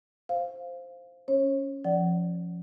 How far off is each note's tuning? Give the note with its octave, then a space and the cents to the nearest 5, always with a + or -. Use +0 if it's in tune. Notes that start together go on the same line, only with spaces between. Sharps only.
C5 +0 F5 +0
C#4 +0 C#5 -35
F3 +0 D5 +0 F#5 +25